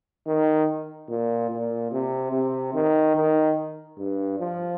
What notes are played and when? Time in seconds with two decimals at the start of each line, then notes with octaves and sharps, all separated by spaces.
0.27 D#3
1.09 A#2
1.51 A#2
1.92 C3
2.32 C3
2.74 D#3
3.15 D#3
3.98 G2
4.39 F3